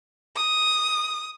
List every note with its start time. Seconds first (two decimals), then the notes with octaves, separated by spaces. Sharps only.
0.36 D#6